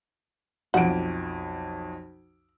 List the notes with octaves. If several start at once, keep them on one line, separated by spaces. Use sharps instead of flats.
B1 F2 F#4 D7